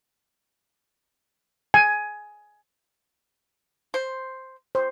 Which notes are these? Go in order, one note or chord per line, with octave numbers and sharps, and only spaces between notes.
G#5
C5
C5